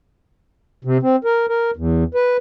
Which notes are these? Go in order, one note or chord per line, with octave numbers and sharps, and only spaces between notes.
C3
C4
A#4
A#4
E2
B4